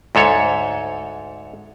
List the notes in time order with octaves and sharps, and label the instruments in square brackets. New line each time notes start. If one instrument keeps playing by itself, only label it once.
[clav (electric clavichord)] D2 G#2 A4 C#5